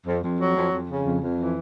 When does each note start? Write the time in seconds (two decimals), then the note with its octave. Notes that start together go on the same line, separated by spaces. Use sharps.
0.06 F2
0.23 F2
0.39 F#3
0.56 F2
0.72 F2
0.88 C#3
1.05 F2
1.21 F2
1.38 E3